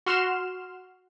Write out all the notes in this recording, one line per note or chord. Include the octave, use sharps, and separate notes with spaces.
F#4 C6 F6 E7